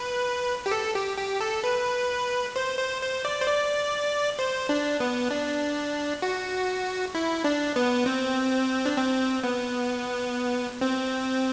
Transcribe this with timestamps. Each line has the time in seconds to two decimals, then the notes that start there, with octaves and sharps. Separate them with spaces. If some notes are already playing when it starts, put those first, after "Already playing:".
Already playing: B4
0.66 G4
0.71 A4
0.95 G4
1.17 G4
1.41 A4
1.64 B4
2.56 C5
2.79 C5
3.02 C5
3.25 D5
3.41 C5
3.47 D5
4.39 C5
4.69 D4
5.00 B3
5.31 D4
6.22 F#4
7.15 E4
7.44 D4
7.76 B3
8.06 C4
8.86 D4
8.97 C4
9.44 B3
10.81 C4